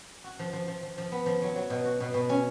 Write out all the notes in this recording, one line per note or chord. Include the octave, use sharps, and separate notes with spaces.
F#4
F3
F3
F3
F3
F3
B3
F3
F#3
F#3
B2
F#4
B2
B2
C#4